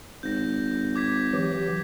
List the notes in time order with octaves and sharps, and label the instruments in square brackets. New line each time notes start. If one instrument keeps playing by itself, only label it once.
[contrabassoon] G#1 [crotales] G6 A#6
[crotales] D6 G#6 B6
[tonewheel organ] E3 F#3 G4